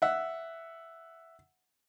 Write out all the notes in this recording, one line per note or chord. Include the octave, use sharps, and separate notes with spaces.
E5 F#5